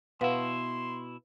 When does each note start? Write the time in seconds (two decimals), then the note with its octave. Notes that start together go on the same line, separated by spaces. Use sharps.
0.21 B2 E4 B4 F5 F#5 C6